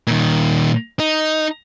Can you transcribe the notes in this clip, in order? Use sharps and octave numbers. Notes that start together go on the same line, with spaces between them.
A#2 D#3
D#4